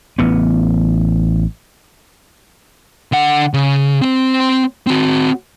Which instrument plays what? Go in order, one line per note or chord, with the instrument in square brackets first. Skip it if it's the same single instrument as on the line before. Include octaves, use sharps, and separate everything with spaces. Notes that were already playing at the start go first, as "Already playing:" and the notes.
[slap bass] A1 B3
[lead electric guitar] D3 F#5
C#3
C4 C5
C4 F#4